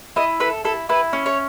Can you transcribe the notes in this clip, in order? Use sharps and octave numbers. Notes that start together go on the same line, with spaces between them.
E4 D#5
A4 B4
E4 A4
E4 B4
C#4
C#5